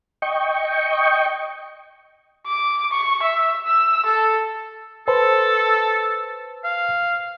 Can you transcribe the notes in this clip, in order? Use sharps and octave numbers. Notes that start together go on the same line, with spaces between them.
D#5 G5 C#6
D6
C#6
E5
E6
A4
A4 B4 C5 A5
F5